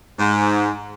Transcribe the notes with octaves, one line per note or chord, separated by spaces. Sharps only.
G#2